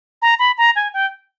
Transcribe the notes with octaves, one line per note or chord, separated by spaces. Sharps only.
A#5
B5
A#5
G#5
G5